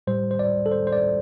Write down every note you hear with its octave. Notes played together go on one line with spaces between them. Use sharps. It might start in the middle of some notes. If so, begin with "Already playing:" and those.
A2 G3 C5
C5
D5
A4
C5
C5
D5